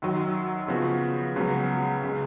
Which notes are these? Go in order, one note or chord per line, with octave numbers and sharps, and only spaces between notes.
F#2 D#3 F#3
C#3 F3 B3 F#4
C#2 C#3 F#3 B3
C#3 G#3